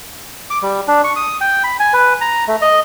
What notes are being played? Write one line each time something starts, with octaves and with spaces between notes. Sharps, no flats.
D6
G3
D4
C#6
D#6
G5
B5
G#5
B4
A#5
A3
D#5